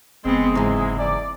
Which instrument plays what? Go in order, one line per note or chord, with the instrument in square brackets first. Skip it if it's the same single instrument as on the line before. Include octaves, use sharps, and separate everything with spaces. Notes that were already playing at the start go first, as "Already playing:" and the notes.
[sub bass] F#1 [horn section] G#3 [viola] B3 C4
[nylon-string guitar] G#2 C3 [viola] E3
[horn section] D5